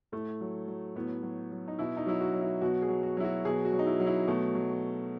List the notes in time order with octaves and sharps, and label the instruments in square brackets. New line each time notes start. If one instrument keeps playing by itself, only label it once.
[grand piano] A2 A3
F#3
F#3
A2 B3
F#3
F#3
D#4
B2 E4
D#4
F#3 E4
F#4
F#3
E4
B2 F#4
G#4
F#3
F#4
F#3 E4
F#4
B2 G#4
F#4
F#3
D#4
E4
F#3
E4
B2 A3
F#3